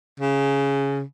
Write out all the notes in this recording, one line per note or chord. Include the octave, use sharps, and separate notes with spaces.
C#3